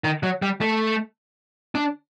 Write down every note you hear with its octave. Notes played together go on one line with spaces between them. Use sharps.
D#3
F#3
G3
A3
D4